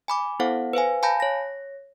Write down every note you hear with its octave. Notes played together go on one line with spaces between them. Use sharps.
G#5 B5 D6
B3 E4 A4 C5 F5 F#5
B4 C5 F5 G#5
F5 G#5 A5 B5 G6 A#6
C#5 A#6